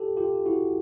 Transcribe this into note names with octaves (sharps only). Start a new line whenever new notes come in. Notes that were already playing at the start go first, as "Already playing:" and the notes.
Already playing: G4 A4
F4 G4
E4 F#4